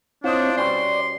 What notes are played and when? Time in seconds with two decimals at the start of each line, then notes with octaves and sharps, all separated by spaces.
0.24 C4 D4 E4 F4 C5 C#5 D#5
0.57 B2 G3 C#4 D5 C6